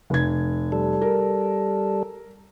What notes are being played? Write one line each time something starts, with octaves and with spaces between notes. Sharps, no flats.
F1 G#6
G3 A4
A#4